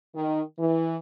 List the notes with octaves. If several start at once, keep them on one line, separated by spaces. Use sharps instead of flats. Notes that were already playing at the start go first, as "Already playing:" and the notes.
D#3
E3